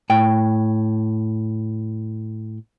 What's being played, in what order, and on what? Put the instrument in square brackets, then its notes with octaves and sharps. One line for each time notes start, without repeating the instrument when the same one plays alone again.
[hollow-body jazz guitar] A2 G5